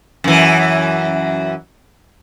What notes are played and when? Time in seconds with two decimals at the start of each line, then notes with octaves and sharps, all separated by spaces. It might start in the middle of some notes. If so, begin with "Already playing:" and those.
0.24 F#2 E3